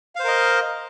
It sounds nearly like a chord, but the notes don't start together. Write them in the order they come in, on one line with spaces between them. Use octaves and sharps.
F5 C5 A#4 D#5